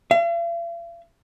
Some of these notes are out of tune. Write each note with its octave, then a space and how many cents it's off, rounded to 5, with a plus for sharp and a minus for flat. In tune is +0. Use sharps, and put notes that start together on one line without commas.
F5 -45